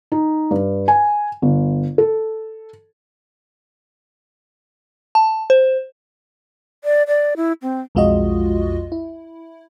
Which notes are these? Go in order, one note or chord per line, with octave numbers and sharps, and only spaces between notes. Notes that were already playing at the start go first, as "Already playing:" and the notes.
D#4
G2
G#5
G1
A4
A5
C5
D5
D5
E4
C4
B1 F2 G#3 F4 F#4 D#5
E4